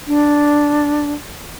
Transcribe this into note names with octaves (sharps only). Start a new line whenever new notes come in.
D4